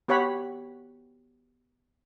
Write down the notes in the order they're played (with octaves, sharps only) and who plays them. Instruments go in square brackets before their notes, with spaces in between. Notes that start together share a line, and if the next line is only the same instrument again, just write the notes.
[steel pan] B3 G4 C#5 F#5 B5